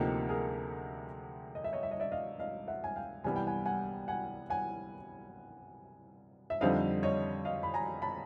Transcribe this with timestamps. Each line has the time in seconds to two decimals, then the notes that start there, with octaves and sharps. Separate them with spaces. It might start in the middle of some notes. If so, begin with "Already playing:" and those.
Already playing: D2 C3 F3 A#3 D#4 G4 A4
0.29 G#4 A#4
1.55 D#5
1.64 E5
1.73 C#5 D#5
1.83 E5
1.91 D#5
2.00 D5 E5
2.12 D#5 F5
2.40 D#5 F5
2.68 E5 F#5
2.84 G#5
2.96 F5 G5
3.24 C2 C3 E3 G3 B3 G#5
3.36 G5
3.47 F#5 G#5
3.66 F#5 G#5
4.08 F#5 G#5
4.50 F#5 G#5
6.50 E5
6.61 F2 D3 G3 C4 D#4 D#5 F5
7.03 C#5 D#5
7.45 D#5 F5
7.63 B5
7.74 G#5 A#5
8.02 A5 B5